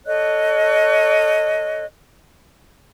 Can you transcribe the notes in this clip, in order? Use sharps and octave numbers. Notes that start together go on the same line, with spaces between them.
A4 C#5 D#5 F#6